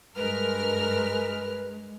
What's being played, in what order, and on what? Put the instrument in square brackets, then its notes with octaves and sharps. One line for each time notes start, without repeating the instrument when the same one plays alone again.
[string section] G2 A#4 F6 [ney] G#3 [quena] B4